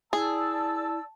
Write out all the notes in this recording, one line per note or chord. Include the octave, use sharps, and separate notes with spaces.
E4 G#4 D5 A5 E6